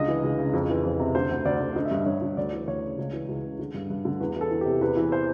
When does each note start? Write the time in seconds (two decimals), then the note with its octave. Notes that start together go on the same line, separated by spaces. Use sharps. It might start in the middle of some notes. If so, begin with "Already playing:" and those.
Already playing: C#2 D3 D#5
0.08 E3
0.23 C#2
0.39 C#3
0.54 F2
0.70 E3
0.85 F2
1.00 C3
1.15 D3 C5
1.30 D2
1.45 D2 D5
1.61 D3
1.76 D3 D#5
1.85 E5
1.91 G2 D#5
2.06 G2 C#5
2.22 D3
2.37 D2 D5
2.53 E3
2.67 D2 C#5
2.83 C#3
2.98 C#2
3.13 E3
3.29 C#2
3.44 C#3
3.59 D3
3.74 G2
3.90 G2
4.05 D3
4.20 E2 B4
4.35 E3
4.41 A4
4.51 E2
4.61 G4
4.66 C3
4.81 E2 B4
4.97 E3
5.12 C5